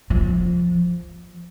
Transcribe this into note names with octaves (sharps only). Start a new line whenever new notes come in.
F3